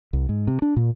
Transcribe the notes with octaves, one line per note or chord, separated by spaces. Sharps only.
C2
G#2
C3
D4
A#2